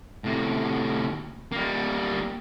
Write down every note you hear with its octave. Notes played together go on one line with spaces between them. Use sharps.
A2 C3
G3 A#3